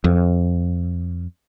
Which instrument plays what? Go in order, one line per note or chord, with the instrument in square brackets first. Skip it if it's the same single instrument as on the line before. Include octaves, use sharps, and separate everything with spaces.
[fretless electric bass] F2